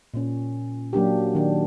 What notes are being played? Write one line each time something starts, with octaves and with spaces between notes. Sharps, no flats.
A#2 C#4
F#3 A#3 D4 G4
D#3 D4